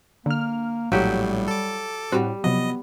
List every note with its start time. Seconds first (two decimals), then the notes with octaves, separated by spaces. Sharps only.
0.26 D3 A#3 F6
0.92 A#1 A2 F#3 G3 F4 G4
1.48 A4 D6
2.12 A2 G3 C4 F#4
2.44 C3 F3 F#3 B3 D#5